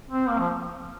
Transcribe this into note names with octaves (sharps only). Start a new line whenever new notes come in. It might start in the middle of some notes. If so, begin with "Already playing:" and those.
C4
A#3
F3